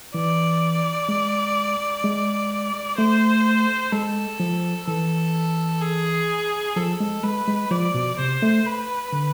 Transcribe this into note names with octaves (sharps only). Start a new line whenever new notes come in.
E3 D5
G#3
G#3
A3 C5
G#3 A4
F3
E3 A4
G#4
F3 A4
G#3
G#3 B4
G#3
F3 D5
B2
C3 C5
A3
B4
D3